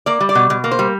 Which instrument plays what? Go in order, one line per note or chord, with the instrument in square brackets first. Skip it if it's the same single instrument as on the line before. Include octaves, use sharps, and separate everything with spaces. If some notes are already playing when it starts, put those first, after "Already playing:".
[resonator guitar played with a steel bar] A#3 D5
G3
D5
B2
B2
A#3
C5
G3